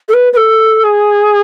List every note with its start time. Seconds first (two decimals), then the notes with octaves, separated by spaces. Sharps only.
0.08 A4
0.13 B4
0.32 B4
0.36 A4
0.83 G#4